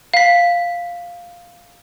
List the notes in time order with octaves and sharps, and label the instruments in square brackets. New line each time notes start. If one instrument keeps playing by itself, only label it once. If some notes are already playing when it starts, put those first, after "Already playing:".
[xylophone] F5 B6